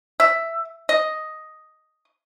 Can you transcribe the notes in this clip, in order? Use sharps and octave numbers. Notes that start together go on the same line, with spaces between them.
E5
D#5